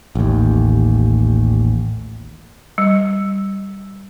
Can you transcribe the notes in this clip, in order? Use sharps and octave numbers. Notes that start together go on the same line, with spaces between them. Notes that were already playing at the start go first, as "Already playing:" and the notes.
A1 D#2
G3